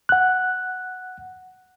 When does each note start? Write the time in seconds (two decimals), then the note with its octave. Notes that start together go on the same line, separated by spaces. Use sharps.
0.09 F#5 F#6